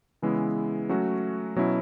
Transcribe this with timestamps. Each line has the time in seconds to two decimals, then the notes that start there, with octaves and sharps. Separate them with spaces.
0.22 C#3 E3 G#3 B3 E4
0.89 F#3 A3 C#4 F#4
1.56 B2 F#3 C#4 E4